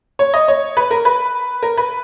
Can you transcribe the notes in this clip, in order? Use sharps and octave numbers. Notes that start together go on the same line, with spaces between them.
C#5
D#5
C#5
B4
A#4
B4
A#4
B4